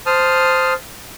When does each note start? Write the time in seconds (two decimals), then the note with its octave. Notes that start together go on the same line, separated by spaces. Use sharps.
0.06 C5 A5 D#6 F6